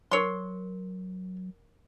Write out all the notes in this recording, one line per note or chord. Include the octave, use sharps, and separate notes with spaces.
F#3 A#4 C5 C#5 C6